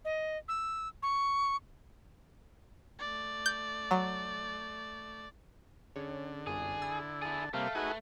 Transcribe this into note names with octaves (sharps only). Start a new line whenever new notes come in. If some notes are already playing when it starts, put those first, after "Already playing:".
D#5
E6
C#6
A3 D5
G6
F#3
D3 C#4 G#4 C#5
G1 C2 F#2 G#4
E4 E6 A6
E4 G#4 A5
C3 G3 A3 A#3 F5
D#4 F#4 G#4 B4